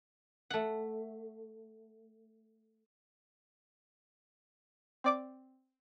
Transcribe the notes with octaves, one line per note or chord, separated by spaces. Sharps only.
A3 F#5
C4 D5 D6